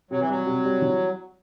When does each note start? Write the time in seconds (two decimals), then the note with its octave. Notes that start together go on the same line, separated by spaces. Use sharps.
0.11 C3 F#3
0.20 E3
0.29 F#3 G3
0.47 C3
0.64 G3
0.82 E3